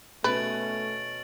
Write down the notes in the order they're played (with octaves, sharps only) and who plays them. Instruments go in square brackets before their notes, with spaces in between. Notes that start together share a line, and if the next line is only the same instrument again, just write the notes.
[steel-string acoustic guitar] B2 C#4 [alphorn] A3 [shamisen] B4 [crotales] A6 D7 F#7